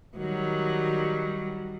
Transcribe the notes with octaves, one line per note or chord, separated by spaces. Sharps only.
D#3 F#3 G3